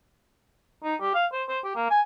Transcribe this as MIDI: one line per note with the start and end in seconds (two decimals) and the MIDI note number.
0.84 0.95 63
1.01 1.12 67
1.15 1.26 77
1.33 1.43 72
1.49 1.59 72
1.64 1.73 67
1.76 1.89 58
1.90 2.01 80